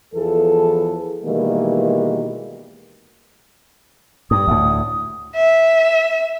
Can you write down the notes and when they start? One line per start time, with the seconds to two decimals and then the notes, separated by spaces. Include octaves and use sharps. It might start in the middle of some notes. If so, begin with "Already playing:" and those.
0.15 E2 E3 F3 G#4 A4
1.24 B2 D#3 E3 G3 G#3 A#3
4.31 G2 D#6
4.47 D2 A2
5.35 E5